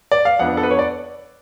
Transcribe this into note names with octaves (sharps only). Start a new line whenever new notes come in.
D5
F5
F2 F3 B3 D4 F#5
A4
B4
C#5
D5